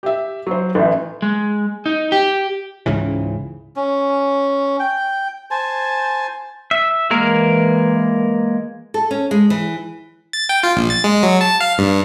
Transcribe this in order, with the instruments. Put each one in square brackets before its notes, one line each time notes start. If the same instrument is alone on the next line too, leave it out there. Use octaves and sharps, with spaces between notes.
[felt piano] G4 E5
F#3 C5
A1 E3
[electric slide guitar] G#3
D#4
G4
[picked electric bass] C#2 G#2 C#3 E3
[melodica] C#4
G5
C5 G#5 A5
[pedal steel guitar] E5
[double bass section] E3 [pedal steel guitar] G#3 A#3 A#4
[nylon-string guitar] A4
C#4
G#3
E3
[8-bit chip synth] A6
G5
F4
A#1
A6
G#3
F#3
A5
F5
G2